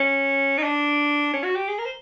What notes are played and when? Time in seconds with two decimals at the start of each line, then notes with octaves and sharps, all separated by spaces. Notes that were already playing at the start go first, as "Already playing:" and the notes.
Already playing: C#4
0.58 D#4
0.63 D4
1.33 C#4
1.44 F#4
1.56 G4
1.68 G#4
1.79 A#4
1.85 C5